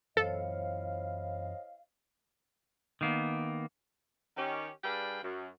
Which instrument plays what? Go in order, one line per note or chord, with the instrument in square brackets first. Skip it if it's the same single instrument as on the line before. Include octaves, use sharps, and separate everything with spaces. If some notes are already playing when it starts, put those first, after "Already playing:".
[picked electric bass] F#2 E3 [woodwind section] E4 D#5 F5 [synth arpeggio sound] A4 [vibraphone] C5 C#5
[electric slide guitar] D#3 A#3 B3
[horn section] D#3 C#4 G4
G3 D4 G#4 B4 F5 G5
F#2